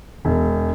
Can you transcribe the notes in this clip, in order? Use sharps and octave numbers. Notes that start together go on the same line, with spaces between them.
E1